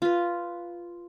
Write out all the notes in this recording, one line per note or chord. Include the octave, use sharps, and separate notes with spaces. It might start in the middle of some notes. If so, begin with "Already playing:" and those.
F4 B4